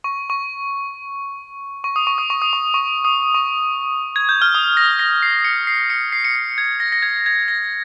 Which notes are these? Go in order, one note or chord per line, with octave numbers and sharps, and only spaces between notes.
C#6
C#6
C#6
D#6
C#6
D#6
C#6
D#6
C#6
C#6
D#6
C#6
G#6
G6
F6
D#6
A#6
A#6
C7
C#7
C7
C#7
C7
C#7
C7
G#6
A#6
A#6
G#6
G#6
A#6